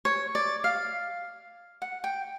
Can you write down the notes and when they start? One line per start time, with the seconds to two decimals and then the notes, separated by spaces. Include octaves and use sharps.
0.05 C#5
0.35 D5
0.64 F5
1.82 F#5
2.04 G5